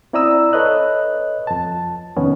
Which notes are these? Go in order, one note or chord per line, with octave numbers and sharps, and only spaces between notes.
C4 E4 D5 A#5 D#6 E6
A4 B4 C#5 D#5 F#6
F2 A5
C2 F2 D#3 B3 C#4